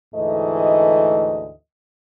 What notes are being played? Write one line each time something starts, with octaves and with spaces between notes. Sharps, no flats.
D2 G#2 E3 A3 D#5